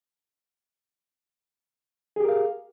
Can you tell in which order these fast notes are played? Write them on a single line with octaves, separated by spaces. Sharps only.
G#4 G4 A#4 F5